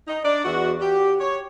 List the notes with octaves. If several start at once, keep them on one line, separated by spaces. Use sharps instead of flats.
D#4
D4 D5
E2 F#4
G4
C#5